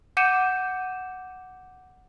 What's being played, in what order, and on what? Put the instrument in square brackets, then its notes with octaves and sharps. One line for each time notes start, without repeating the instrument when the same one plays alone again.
[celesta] F#5 D6 G6 C#7 D#7 E7